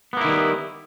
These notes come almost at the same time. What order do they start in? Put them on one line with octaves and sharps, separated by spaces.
B3 A#3 E4 D#3 G3